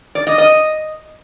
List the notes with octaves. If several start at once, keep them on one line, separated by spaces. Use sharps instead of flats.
D5
D#5
D#5